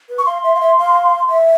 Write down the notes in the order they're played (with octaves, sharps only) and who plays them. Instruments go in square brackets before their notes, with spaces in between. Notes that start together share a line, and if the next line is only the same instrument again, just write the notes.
[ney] B4
[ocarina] C#6
[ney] F5 [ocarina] C6
[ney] E5
F5
E5
F5
E5